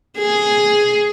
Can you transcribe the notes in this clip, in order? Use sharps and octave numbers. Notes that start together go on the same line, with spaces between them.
G#4